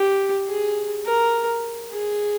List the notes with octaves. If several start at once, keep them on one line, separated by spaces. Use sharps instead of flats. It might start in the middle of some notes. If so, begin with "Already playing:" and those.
Already playing: G4
G#4
A#4
G#4